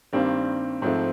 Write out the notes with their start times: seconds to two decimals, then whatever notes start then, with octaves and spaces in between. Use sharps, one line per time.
0.13 G2 D#3 G3 A#3 C4 D4
0.82 G#2 F3 A3 C4